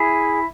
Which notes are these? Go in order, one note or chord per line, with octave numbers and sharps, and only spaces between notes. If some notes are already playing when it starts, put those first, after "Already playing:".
Already playing: E4 G#4